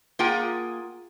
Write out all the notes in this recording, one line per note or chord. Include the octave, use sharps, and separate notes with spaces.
A#3 F4 G#4 F#5 G5 A#5